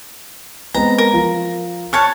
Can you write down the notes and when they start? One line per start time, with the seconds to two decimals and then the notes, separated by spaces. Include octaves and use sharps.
0.74 G#3 B3 C4 A#5
0.98 A#4
1.13 F3 F4
1.93 C#5 A5 C#6 F6 F#6